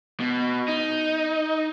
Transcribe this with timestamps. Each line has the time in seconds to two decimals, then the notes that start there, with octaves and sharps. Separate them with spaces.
0.20 B2
0.68 D#4